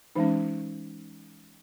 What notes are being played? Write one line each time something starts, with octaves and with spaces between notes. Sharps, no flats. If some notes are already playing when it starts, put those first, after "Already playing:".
E3 G#3 C#4 D#4